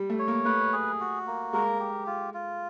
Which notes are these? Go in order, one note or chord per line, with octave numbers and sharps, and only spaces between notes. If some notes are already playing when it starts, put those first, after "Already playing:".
Already playing: G3
A3
C#5
A#3
A3 B4
G#4
F#4
A#3
G#3 A#4
G4
F4
F4